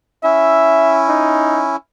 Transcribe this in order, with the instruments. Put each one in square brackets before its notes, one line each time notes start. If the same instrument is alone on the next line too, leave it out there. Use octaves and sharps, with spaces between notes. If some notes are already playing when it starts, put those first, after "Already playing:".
[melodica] C#4 E4 [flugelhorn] E5
[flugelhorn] D#4